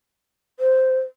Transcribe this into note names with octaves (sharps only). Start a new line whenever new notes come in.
C5